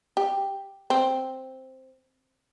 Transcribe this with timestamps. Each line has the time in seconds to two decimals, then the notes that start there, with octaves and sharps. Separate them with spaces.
0.17 G4
0.90 C4